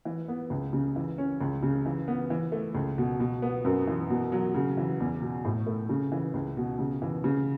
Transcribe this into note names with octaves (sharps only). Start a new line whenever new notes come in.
E3
B3
C#2
C#3
E3
C#4
C#2
C#3
E3
B3
E3
A3
C#2
B2
B2
B3
F#2
E3
B2
F#3
C#3
E3
E2
B2
A2
A3
C#3
E3
C#2
B2
C#3
E3
C#3